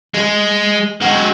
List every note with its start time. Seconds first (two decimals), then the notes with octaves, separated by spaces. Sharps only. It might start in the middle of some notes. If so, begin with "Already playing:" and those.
0.14 G#3
1.02 G#3 F#4